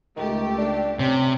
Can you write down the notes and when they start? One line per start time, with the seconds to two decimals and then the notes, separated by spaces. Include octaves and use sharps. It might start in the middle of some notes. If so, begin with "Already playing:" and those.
0.16 C#2 D#3 A3 G4
0.58 D4
0.99 C3 C#4